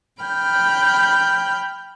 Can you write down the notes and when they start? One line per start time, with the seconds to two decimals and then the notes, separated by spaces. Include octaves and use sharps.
0.22 G5 B5 F6 G6